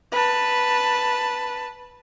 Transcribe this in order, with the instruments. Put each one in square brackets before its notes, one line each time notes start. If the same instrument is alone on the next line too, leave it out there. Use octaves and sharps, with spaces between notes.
[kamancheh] B4 A5